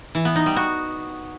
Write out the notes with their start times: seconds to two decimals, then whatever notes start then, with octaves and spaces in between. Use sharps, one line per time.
0.15 E3
0.25 B3
0.36 D#4
0.46 G3
0.56 F#4